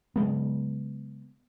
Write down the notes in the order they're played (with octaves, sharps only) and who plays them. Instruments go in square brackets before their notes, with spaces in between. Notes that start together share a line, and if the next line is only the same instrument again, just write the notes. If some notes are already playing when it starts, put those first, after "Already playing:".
[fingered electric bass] C#3 F#3 G#3 B3